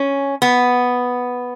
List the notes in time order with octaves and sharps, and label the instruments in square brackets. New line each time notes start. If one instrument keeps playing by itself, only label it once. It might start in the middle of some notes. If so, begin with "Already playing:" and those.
Already playing: [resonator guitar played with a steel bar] C#4
B3